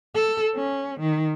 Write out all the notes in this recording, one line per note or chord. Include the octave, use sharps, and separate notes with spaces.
A4
C#4
D#3